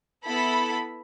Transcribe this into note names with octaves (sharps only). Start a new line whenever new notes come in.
B3 E4 A4 B5